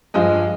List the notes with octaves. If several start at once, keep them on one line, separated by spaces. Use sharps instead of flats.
G2 F3 G#3 D#5